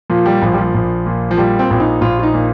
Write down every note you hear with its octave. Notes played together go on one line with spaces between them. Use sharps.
A#2 F3
G3
A#1 F3
G3
F3
A#1
A#2
F3
A#2 G3
C4
A#1 C4
D#4
A#1 F4
F4
D#4
A#2